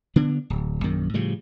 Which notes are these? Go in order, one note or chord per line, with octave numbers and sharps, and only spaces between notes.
D3 B3 D4
D1
A#1 F#2 D#3
A2 C#3 F3 G3